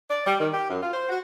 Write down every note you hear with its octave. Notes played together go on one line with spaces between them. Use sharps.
D5
G3
D#3
G4
F#2
F4
C5
F#4